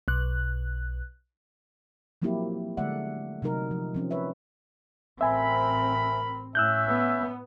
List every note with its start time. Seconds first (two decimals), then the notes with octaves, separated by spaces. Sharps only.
0.08 B1 F#6
2.22 F3 F#3 A#3 C4 E4 G4
2.77 D3 G#3 A3 D5 E5 F#5
3.42 C3 F#3 D#4 A#4
3.71 F3
3.95 F3 C4 C#4
4.11 B4 C#5 E5
5.21 A1 C4 A#4 E5 G#5 B5
6.55 A2 C#4 E5 E6 F#6 G6
6.89 B3